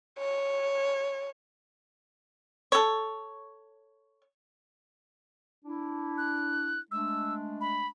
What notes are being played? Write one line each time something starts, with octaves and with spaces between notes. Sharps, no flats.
C#5
A4 C#5
D4 E4
F#6
G#3 A3 D4 E6
B5